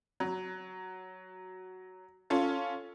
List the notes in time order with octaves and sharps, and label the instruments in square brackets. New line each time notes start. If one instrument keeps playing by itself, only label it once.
[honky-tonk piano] F#3
C#4 F4 A4